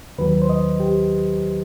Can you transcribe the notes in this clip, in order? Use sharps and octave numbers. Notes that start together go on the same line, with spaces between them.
D#2 D#3 F#3 B4
C5
D#5
G4